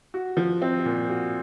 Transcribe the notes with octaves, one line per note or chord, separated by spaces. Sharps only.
F#4
F3
C4
A#2
F#4